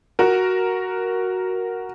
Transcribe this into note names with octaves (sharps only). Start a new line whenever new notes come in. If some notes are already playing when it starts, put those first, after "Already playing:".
F#4 A#4